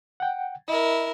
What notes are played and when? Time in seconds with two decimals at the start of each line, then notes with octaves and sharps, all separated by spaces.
0.20 F#5 G5
0.68 E4 A#4 D#5